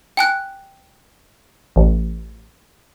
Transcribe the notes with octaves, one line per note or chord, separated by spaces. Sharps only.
G5 G#5 F#6
A1